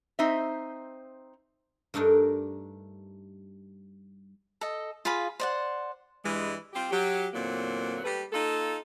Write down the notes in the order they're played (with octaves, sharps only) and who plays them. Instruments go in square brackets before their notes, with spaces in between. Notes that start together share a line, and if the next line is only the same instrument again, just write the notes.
[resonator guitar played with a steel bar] C4 D#4 C5 E5
[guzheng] G2 A3 D4 D#4 A#4
[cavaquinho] A4 D#5
F4 G#4 F5 B5
C5 D5 F#5
[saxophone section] G2 E3 G3 G#3
G3 C4 F4 G4
F#3 G4
E2 A#2 D3 F#3 A#3 C4
G3 A3 B4
A#3 D#4 F4 A4